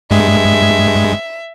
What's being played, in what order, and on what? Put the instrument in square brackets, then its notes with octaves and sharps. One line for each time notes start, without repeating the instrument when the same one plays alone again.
[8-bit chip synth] G2 G#3 [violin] E5